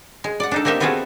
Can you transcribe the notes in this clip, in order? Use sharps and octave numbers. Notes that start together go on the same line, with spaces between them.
G#3
D5 F#5
D4 D#4 A4
A#3 C4 D#4 G4 E5
B3 C4 F4 F#4 G#4 A4